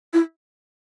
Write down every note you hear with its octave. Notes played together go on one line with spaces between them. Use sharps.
E4